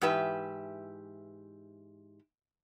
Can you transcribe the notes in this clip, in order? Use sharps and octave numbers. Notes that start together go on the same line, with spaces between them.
G#2 E3 G4 B4 E5